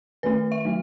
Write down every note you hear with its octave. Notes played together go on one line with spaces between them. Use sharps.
D#3 A3 C#4 B4
E5
F#3 A3